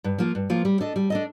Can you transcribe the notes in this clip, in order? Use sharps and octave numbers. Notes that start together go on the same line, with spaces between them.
G2
F3 A#3 F4
G2
F3 A#3 F4
G3
D4 A4 D#5
G3
D4 A4 D#5